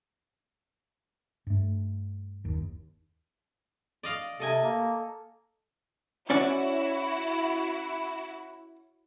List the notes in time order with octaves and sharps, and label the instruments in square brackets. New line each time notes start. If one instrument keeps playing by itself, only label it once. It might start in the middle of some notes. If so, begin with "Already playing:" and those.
[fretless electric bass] G2 A3
F#1 D#2
[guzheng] D5 D#5 F5
[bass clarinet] C3 [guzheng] A4 D#5 G#5
[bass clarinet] A#3
[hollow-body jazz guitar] C#4 D5 F#5 [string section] E4 F#4